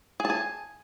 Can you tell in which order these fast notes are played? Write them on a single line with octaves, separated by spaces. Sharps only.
G#4 A5 G#5